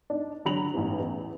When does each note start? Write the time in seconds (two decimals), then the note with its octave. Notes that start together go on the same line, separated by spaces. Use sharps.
0.10 D4 D#4
0.45 D3 F#3 A#5 B5 F7 F#7
0.74 A1 E2 G#2 E3
0.99 E2